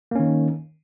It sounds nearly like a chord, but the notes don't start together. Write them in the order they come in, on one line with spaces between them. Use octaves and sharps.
A#3 C#4 D#3